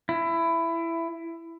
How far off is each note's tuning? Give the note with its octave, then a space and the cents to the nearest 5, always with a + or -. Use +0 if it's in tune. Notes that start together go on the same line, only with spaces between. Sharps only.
E4 +15